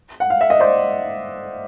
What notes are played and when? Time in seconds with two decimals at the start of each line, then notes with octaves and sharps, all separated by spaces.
0.20 F#5
0.30 F5
0.41 E5
0.50 D#5
0.60 C5 D5